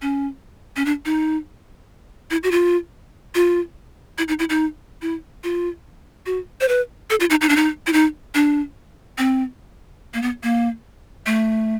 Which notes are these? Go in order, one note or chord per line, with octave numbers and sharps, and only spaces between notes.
C#4
C#4
D4
D#4
E4
F#4
F4
F4
E4
D#4
E4
D#4
E4
F4
F#4
C5
B4
A4
F4
D#4
D#4
D4
D#4
E4
D#4
D4
C4
A#3
B3
A#3
A3